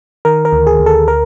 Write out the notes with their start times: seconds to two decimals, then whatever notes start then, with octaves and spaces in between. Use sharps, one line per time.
0.25 D#3 A#4
0.45 A#4
0.52 D2
0.67 G#4
0.79 D2
0.86 A4
1.08 A#4